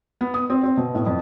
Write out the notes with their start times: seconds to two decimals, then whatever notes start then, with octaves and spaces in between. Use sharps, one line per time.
0.21 B3
0.34 D#6
0.50 C4
0.63 C4
0.77 B2
0.95 A2
1.06 F2